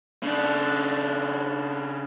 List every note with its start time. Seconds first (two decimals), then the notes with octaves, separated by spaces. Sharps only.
0.23 C#3 D4